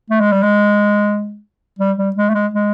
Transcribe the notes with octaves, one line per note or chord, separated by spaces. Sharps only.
A3
G#3
G3
G#3
G3
G3
G#3
A3
G#3
G#3